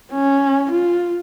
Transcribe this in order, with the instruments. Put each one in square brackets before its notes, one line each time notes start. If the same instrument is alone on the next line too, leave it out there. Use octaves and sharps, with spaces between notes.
[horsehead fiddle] C#4
F4